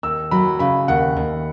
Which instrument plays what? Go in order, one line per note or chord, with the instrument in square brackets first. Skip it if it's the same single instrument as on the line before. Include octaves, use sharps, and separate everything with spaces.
[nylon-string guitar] D#2 [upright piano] E6
[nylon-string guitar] F#3 [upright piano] B5
[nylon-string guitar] C#3 [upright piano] B5
[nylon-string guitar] D#2 [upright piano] F#5
[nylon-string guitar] D#2